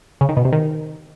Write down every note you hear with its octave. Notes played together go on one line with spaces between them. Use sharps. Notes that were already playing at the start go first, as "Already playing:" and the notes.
C#3
D#3
B2
C3
D#3